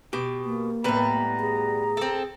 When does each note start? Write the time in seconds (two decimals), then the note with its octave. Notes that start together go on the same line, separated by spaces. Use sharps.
0.13 B2 G4
0.45 A#3
0.84 A2 G3 B3 B4 A#5
1.40 G#4
1.97 C4 A4